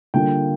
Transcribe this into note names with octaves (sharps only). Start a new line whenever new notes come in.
D3 G3 A#3 D4 F4 G5